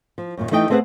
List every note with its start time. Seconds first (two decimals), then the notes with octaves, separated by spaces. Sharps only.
0.18 F3
0.37 F#2 A#2 D#3
0.51 E3 A3 D#4 D#5 G5
0.70 A3 C4 G#4 B4 C5 F#5